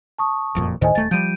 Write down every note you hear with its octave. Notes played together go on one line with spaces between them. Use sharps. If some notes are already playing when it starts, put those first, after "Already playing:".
A5 C#6 D#6
F#1 F2 A#2
D2 A2 D#3 C5 D#5 G#5
D#1 A3 A6
F3 G3 G6 D7 D#7